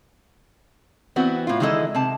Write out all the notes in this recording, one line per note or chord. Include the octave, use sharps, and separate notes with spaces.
E3 B3 C4 F#4
A2 F4
D#3 E3 G#3 E4 A4 D#5
C3 A5